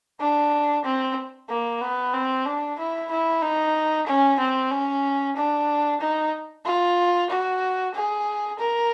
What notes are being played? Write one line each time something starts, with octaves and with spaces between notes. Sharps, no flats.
D4
C4
A#3
B3
C4
D4
E4
E4
D#4
C#4
C4
C#4
D4
D#4
F4
F#4
G#4
A#4